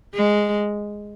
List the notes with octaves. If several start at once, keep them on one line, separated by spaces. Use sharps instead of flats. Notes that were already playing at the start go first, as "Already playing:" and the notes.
G#3